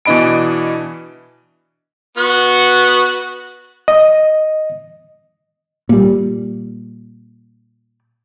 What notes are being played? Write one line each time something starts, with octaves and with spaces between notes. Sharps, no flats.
B2 E3 D4 D#5 B5 D7
B3 F#4
D#5
A#2 G3